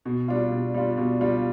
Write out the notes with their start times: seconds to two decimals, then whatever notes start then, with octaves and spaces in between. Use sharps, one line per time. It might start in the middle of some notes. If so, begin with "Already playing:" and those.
0.05 B2
0.28 G3 D4 F4
0.52 B2
0.74 G3 D4 F4
0.97 B2
1.21 G3 D4 F4